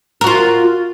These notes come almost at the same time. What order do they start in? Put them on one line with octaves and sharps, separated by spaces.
A#4 F#4 F4